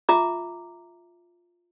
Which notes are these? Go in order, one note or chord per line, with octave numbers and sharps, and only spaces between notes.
F4 E5 A#5 D6